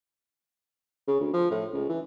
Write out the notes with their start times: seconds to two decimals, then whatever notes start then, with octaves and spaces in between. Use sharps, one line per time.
1.08 C#3
1.20 D2
1.33 F3
1.51 A2
1.73 C#2
1.89 E3